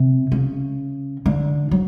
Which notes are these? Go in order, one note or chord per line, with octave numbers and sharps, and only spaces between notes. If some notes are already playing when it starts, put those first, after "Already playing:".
Already playing: C3
C#3
D3
F#3